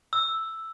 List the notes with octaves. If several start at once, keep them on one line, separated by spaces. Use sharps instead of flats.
E6